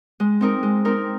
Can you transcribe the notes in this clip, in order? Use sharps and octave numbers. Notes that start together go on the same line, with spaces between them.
G#3
C4 D#4 A#4
G#3
C4 D#4 A#4